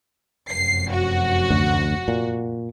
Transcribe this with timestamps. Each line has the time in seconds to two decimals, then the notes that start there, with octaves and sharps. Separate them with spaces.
0.49 F1 F#2 C7
0.91 F#4
1.50 D2
2.08 A#2